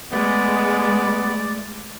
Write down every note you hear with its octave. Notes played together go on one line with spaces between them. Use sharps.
G#3 A3 B3 D5